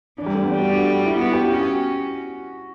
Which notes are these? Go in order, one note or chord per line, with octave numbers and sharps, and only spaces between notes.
E3 D4
G3
A3
B3
G3 D4
F#4
F#4
E4
B3 F#4
G4
C#4 F#4